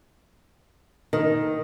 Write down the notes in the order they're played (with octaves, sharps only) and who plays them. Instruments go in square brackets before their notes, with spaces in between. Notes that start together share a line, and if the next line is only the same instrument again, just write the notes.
[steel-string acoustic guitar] D#3